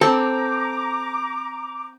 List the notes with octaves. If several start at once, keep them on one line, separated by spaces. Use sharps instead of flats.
C4 A4 A#5 D6